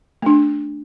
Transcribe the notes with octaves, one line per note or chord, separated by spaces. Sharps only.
A3 D4